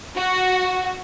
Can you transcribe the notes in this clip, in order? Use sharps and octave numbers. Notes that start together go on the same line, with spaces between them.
F#4